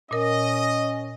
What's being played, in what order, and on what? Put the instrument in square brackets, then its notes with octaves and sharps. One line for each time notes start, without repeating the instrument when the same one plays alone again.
[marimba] A#2 A#4 [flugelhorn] C#4 [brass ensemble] D#5